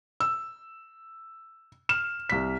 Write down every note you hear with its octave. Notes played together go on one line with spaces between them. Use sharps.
E6
F6 E7
C2 B6